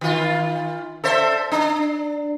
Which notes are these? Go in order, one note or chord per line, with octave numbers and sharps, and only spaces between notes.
D#3 F4
A4 C5 E5
D4